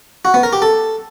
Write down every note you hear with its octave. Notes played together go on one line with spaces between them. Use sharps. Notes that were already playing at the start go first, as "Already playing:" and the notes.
F#4
B3
A#4
G4
A4